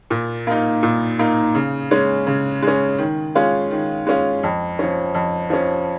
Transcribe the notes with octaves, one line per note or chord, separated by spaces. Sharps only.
A#2
A#3 D#4
A#2
A#3 D#4
C#3
G#3 C#4
C#3
G#3 C#4
D#3
G#3 C#4 F4
D#3
G#3 C#4 F4
F2
F3 C#4
F2
F3 C#4